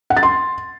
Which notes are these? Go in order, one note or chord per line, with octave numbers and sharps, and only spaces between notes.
F#5
A6
C6